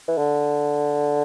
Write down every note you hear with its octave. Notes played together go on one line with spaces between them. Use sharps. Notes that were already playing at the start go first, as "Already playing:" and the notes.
E3
D3